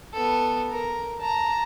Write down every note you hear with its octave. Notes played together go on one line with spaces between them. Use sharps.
B3 A4
A#4
A5 A#5